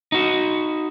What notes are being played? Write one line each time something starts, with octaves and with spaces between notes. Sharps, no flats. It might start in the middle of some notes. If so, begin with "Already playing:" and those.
D#4 F#4